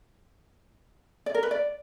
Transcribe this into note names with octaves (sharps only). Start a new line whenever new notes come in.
D5
A#4
B4
D5